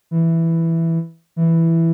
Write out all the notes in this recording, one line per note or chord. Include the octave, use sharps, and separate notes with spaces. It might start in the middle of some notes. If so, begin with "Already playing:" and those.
E3
E3